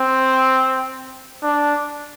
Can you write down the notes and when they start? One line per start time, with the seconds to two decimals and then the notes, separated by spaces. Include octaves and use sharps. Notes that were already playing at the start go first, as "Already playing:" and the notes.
Already playing: C4
1.43 D4